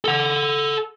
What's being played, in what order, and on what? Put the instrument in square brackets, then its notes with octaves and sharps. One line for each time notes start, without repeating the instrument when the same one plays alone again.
[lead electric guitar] A4 F#5